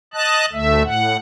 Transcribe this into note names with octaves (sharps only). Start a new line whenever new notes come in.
D#5 A5 F#6
D2 A3 E5
A2 F#5